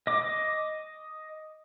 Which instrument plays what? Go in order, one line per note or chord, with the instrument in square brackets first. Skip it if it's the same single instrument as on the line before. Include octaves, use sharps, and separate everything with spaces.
[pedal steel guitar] D#5 D6